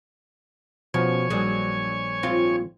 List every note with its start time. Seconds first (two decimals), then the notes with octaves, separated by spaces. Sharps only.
0.94 B2 F3 C#4 F#4 C#5 G#5
1.30 A#1 F#3 G3 G#4
2.23 G#2 C4 F4